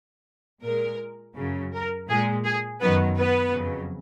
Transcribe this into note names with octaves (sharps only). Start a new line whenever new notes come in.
A#2 G#3 A#4
F#2 C#3 F#3
A#4
A#2 G#3 G#4
G#4
F#2 D#3 F#3 B3 B4
B3 B4
F2 C#3 F#3